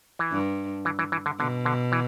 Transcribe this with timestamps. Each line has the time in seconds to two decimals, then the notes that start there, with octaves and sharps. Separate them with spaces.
0.19 E3
0.32 G2
0.85 E3
0.99 E3
1.12 E3
1.26 D3
1.39 B2 D3
1.65 D3
1.92 E3